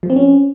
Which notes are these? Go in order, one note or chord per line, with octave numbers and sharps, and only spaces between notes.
F3
C4
C#4